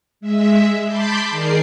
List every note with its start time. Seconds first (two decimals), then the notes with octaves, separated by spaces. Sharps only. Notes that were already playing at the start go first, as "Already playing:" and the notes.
0.21 G#3 E5
0.87 A5 B5 C6 D6 G6
1.30 D#3 G#4 A#4 D5 C7